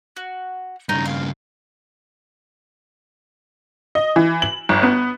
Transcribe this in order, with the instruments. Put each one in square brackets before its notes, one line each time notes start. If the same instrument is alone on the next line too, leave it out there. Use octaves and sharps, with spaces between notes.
[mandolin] F#4
[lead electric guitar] G2 C#3 [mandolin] D#4
[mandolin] F5
[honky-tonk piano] D#5
E3
F#7
G1
B3